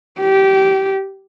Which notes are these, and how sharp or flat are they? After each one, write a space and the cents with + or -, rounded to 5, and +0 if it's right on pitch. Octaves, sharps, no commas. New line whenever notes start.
G4 -20